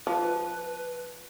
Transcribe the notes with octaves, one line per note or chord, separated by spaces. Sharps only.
F3 B4